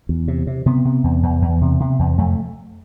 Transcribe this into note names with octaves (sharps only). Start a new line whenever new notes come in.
E2
C3
C3
C3 B3
C3
E2
E2
E2
C3
C3
E2
F2 A3